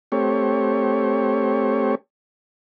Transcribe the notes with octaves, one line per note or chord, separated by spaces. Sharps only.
A3 C4 G4 C#5